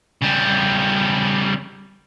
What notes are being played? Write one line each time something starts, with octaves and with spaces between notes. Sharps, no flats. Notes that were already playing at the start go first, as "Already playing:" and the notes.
C#3 G3